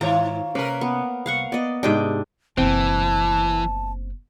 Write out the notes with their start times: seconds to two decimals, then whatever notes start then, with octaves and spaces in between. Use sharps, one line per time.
0.01 G#2 D#3 E4 F4 C#5 A#5
0.55 C3 A#3 C#4 A#4 B4
0.81 B3
1.26 C2 F5 F#5 C#6
1.52 B3 D5 D#5
1.83 G#2 C3 D4 D#5 G5
2.58 F#1 B2 E3 C4 A5